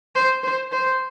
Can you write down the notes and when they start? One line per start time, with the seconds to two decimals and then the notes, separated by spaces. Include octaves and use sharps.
0.15 C5
0.43 C5
0.72 C5